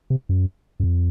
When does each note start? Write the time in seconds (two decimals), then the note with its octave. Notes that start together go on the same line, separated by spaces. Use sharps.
0.10 C3
0.29 F#2
0.80 F#2
0.84 F2